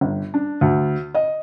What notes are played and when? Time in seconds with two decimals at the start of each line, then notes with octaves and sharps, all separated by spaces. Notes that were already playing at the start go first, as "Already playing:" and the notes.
0.01 G1
0.34 D4
0.61 D2
1.14 D#5